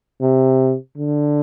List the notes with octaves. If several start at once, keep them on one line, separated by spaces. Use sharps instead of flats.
C3
D3